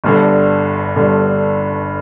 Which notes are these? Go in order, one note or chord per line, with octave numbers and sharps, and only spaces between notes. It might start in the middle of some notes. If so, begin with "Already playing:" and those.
G1 G2 D3
G1 G2 D3